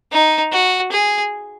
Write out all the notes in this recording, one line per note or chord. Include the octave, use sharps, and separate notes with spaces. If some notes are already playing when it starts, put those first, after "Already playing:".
D#4
F#4
G#4